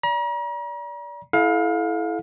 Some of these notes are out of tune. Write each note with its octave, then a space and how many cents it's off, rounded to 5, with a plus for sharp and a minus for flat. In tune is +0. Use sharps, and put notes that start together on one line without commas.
D5 -20 A#5 +40
E4 +0 A4 -30 F5 +30